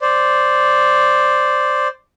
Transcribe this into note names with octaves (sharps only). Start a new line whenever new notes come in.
C5 D5